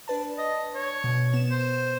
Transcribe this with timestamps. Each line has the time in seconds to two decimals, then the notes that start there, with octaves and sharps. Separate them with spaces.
0.08 D4 B4 A5
0.38 D#5
0.75 C#5
1.04 B2
1.34 B3 E7
1.51 C5